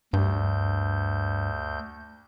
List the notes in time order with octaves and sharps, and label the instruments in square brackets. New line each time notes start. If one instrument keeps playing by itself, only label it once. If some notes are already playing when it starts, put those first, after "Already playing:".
[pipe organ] D2 G6 [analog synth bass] G2